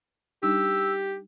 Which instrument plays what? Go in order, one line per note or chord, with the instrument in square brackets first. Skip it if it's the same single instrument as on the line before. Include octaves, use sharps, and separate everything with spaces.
[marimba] G3 D4 D#4 [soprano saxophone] G4 [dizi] E6